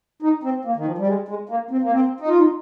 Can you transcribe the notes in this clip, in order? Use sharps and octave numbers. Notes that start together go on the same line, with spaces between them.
D#4
C4
A#3
D#3
F3
G3
G#3
G#3
A#3
C4
A#3
C4
D#4
F4
D#4